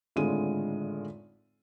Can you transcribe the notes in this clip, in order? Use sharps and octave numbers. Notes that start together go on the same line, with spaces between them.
G#1 A2 D3 G#3 F4 D#7